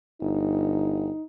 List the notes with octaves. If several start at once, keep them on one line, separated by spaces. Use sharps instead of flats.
G1 D#4